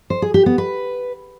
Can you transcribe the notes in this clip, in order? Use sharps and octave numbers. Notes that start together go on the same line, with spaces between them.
C5
G#4
G4
B3
B4